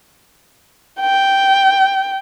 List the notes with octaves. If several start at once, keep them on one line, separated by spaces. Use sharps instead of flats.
G5